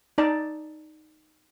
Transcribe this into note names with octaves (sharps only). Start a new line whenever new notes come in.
D#4 D5 A5